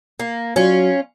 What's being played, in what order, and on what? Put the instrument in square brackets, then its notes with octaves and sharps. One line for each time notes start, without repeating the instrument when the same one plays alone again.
[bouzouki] A#3
[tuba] F#3 [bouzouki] C#4 F4